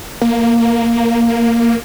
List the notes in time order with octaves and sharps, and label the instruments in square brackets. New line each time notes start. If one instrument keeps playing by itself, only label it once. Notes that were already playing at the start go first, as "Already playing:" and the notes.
[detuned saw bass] A#3